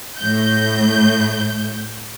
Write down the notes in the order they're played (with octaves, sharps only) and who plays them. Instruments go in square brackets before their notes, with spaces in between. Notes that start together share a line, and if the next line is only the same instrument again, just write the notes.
[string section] A2 G6